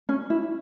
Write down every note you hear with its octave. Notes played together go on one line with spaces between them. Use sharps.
C#4
E4